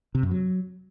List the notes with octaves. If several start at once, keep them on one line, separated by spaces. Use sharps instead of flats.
C3
F#2
F#3